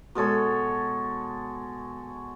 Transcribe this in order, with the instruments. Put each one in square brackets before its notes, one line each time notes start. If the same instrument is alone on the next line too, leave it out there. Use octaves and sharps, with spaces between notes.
[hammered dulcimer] B2 G#3 A4 C#5